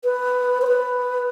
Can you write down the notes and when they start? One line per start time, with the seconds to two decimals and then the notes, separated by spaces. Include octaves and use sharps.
0.04 B4
0.61 C5
0.66 B4